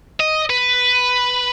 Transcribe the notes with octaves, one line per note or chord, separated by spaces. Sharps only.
D#5
B4